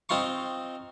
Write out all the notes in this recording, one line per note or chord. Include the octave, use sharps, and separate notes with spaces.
C4 D#4 F4 C6 C#6